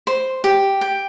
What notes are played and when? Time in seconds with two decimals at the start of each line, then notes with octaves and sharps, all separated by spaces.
0.07 C5
0.44 G4
0.81 G5